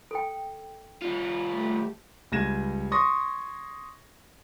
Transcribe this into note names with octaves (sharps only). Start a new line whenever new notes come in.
A4 G5
G3 F4
A3 G4
C#2 G3 G#6 A#6 D#7 E7
C6 C#6 D#6 A#6